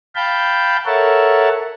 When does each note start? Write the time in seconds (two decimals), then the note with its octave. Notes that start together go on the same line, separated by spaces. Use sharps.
0.16 F5 G5 A5 B5 G6
0.86 A4 A#4 C#5 E5 F#5 A5